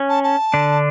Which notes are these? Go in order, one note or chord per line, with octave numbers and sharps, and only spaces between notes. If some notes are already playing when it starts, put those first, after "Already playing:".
Already playing: C#4
A5
A5
D3 D4